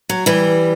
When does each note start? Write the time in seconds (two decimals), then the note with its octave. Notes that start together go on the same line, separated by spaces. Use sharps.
0.09 F#3
0.26 E3 G3